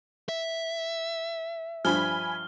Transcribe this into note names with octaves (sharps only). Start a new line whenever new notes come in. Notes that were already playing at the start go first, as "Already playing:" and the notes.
E5
G2 F3 G#5 B5 F6 G7